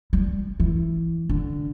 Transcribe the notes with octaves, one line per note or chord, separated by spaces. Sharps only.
G3
E3
D3